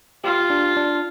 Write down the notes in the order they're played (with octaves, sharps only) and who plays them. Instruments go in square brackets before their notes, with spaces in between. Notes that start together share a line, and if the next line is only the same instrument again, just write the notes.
[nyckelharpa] F4 [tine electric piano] G4
[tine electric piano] D4
D4